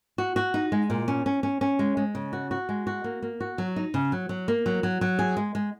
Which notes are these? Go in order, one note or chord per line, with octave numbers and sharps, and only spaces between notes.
F#4
F#4
D#4
G#3
A#2
C#4
C#4
C#4
C#4
G#3
G#3
C#3
F#4
F#4
G#3
F#4
A#3
A#3
F#4
F#3
D#4
C#3
F#3
F#3
A#3
F#3
F#3
F#3
G#4
G#3
G#3